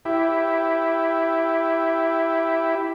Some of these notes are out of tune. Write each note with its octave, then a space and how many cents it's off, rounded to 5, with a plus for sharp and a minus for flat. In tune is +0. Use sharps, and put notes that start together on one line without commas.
E4 +0 G4 -5